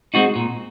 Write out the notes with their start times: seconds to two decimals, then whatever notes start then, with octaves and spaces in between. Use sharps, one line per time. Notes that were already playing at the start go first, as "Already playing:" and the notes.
0.14 G#3 C4 D#4 F#4
0.36 A#2